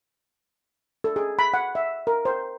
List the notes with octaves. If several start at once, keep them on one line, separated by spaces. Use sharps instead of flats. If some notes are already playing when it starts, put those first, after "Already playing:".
A4
G#4
B5
F#5
E5
A#4
C5